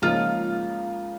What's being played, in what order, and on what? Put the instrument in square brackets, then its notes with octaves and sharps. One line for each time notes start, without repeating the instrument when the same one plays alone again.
[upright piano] C#2 C#3 F3 A#3 D#4 [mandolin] F4